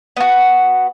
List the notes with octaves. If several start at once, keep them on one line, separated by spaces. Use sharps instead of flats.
B3 F#4